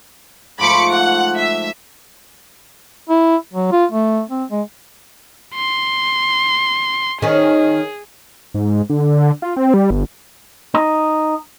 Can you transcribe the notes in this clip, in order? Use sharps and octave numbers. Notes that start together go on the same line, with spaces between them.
G#2 F3 A3 B5 D6 C#7
F#5
E5
E4
F#3
F4
A3
C4
G#3
C6
D#3 C#4 G#4
G#2
D3
F4
C4
G3
G1
D#4